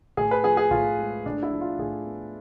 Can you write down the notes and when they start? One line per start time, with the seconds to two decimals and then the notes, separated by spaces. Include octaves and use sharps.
0.17 A2 G#4
0.31 B4
0.44 F3 G#4
0.57 G#4
0.71 A2 F4
0.99 G#3
1.26 A2 D4
1.43 E4
1.52 F3
1.61 F4
1.79 A2 G#4
2.06 B3